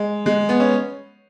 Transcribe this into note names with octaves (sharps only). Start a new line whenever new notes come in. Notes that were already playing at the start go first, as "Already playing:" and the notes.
Already playing: G#3
G#3
B3
C#4